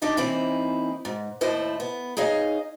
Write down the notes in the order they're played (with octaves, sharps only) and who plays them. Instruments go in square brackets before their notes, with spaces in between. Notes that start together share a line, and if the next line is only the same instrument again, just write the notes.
[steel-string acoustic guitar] D4 D#4 G4 D#5
E3 A#3 C4 C#4 D#4 E4
G#2
D#2 A2 A3 E4 C5 D#5
B3
D#4 G#4 C#5 D#5 F5